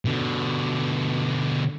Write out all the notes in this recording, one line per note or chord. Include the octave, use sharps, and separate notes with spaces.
B2 D3